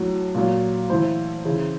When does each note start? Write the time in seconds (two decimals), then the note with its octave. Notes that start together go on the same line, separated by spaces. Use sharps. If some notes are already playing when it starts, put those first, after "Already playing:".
Already playing: A2 F#3
0.35 A#2 F#3
0.89 A2 E3 C5
1.45 C#3 E3